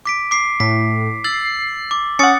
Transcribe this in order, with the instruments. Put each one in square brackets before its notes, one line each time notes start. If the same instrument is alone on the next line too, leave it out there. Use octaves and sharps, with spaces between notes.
[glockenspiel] D6 B6 D7
D6 C7
[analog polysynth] A2 [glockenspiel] B6
[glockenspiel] E6 A6 F#7 [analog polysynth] C7
[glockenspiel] D6
[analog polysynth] C#4 F#5 [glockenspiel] D#6 A6 C#7